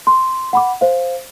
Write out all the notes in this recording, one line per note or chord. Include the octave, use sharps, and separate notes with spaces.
C6
F#5 B5 D6
C5 F5